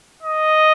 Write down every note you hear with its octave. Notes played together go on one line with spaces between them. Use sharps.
D#5